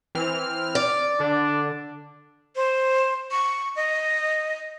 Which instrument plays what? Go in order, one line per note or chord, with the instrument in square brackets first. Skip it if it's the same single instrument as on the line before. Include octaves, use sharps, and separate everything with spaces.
[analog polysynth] E3 C4 F6
[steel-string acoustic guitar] D5
[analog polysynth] D3 [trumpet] D4
[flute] C5
C#6
D#5